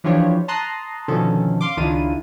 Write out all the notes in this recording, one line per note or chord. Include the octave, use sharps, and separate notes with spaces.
E3 F3 D4 F4 G4 C#5
A5 A#5 C6 D#6 F#6
B2 D3 D#3 F3 C#4 A4
F5 C6 D6
C#2 D#3 D4 E4 F4 D#7